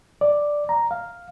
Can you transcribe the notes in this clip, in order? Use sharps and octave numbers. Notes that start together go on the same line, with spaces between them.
D5
A#5
F5